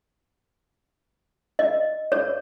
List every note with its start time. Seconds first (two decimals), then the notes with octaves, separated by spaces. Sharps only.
1.59 D#5
2.12 C#5